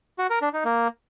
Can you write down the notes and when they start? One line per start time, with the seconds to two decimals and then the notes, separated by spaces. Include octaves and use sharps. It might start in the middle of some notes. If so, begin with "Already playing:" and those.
0.19 F#4
0.30 A#4
0.42 D4
0.53 D#4
0.65 A#3